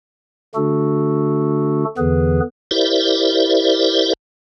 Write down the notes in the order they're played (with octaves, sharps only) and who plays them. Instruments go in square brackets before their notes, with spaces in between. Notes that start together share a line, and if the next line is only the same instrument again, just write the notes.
[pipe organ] D3 A3 D4 F#4 A4
E2 D3 E3 B3 G#4 B4
[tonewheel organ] E4 G4 A#4 C5 D5 E5